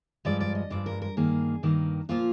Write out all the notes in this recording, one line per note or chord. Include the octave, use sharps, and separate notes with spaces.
G2 F3 G#3 D5
D5
D#5
G2 F3 G#3 D5
A#4
A#4
G2 D#3 A#3 G#4
G2 D#3 A#3
A#2 F3 A#3 F4